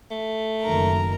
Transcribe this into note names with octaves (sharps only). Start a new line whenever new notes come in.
A3
F#1 D#3 A#4 A#5